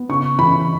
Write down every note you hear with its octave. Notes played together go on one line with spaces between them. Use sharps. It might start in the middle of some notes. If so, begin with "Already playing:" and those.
Already playing: B3
C#3 C#6
E3 B5